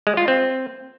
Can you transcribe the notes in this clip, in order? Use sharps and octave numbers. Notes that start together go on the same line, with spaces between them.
G#3
F4
C4